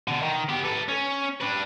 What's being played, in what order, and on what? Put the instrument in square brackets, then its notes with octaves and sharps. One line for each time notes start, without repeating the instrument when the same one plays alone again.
[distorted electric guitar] B2 D3
D#3
B3 G4
A4 B4
C#4
D4 B4